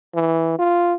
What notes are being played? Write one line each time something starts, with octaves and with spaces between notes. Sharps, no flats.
E3
F4